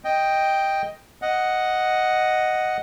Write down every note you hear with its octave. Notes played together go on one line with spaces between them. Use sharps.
D#5 G5
D#5 F#5